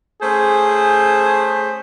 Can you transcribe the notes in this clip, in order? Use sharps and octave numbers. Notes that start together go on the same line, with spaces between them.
A3 C#4 G#4 C5